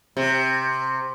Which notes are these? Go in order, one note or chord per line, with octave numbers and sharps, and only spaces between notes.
C3